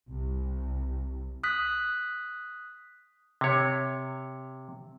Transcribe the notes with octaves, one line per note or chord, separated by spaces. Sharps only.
C2
D#6 F#6 B6
C3 C#5